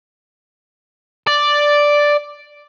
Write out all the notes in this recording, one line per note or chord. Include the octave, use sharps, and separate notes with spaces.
D5